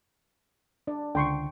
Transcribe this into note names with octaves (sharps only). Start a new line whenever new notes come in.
D4 D5
C#2 D3 G5 C6 C#6